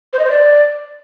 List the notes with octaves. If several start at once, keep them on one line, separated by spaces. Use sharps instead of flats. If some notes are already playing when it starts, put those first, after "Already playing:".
C5
D#5
C5
D5